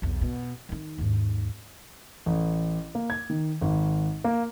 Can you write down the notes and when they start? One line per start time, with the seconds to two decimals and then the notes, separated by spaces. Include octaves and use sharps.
0.02 B1 E2
0.21 B2
0.69 D#3 D#4
0.98 D#2 G#2
2.26 A1
2.95 A#3
3.10 G#6
3.30 D#3
3.61 G#1
4.24 A#3